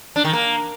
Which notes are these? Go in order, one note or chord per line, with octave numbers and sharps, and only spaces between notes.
D4
D#3
A#3